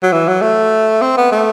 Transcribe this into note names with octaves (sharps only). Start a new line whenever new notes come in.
F#3
E3
F#3
A3
C4
B3
A3